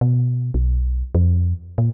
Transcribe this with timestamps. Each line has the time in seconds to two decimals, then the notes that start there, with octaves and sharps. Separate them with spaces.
0.01 B2
0.54 B1
1.15 F2
1.78 A#2